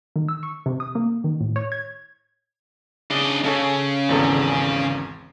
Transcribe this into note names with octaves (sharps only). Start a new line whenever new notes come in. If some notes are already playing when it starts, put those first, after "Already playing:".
D#3
E6
C#6
C3
D#6
A#3
D#3
A2
C#5
G#6
C#3 D4 D#5
C#3 G#4 A4 C#5
G#1 E2 A4